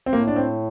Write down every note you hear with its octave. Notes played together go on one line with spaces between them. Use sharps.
C4
A2 A#3
D4
C4